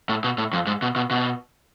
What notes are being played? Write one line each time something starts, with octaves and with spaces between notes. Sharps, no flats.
A2
B2
A2
F2
G#2
B2
B2
B2